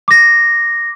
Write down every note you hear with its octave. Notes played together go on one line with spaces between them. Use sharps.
D6 A#6